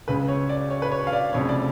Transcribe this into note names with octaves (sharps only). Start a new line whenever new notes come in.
C#2 C#3 B4
C#5
D5
C#5
B4
C#5
F5
D5
F1 F2 C#3 C#5
D5